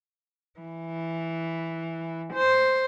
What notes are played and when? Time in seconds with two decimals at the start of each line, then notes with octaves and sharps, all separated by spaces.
0.60 E3
2.33 C5